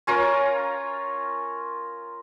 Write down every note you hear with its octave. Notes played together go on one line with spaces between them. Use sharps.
C#4 F4 A#4